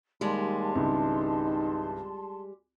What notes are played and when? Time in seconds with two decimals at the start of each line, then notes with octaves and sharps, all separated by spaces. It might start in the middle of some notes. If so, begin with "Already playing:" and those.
0.21 D#2 G3 G#3 A5 C6
0.75 G#1 C#2 D#4 E4